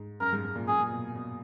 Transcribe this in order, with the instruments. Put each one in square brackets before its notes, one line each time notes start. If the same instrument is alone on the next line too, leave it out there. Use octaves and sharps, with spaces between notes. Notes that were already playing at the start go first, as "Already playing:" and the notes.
Already playing: [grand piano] G#2
[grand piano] F#2 [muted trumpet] A#4
[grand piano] G#2
G#2
A#2
[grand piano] F#2 [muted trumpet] G#4
[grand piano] A#2
B2
B2